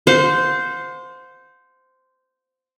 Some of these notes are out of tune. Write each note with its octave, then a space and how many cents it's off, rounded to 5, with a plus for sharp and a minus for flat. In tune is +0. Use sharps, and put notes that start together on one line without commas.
C5 -10 F5 +45